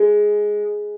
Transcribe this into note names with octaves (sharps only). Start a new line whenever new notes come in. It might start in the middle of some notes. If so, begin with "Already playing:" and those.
Already playing: G#3